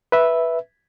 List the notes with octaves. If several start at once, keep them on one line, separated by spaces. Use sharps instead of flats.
B4 E5